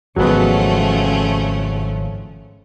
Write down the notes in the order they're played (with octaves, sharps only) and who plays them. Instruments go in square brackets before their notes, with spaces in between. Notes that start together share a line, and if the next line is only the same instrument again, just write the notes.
[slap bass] G#1 C#3 [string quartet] F3 A3 C#4 [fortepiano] F#3 G#3 B3